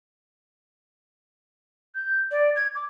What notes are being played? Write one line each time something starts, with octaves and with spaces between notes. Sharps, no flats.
G6
D5
G#6
D6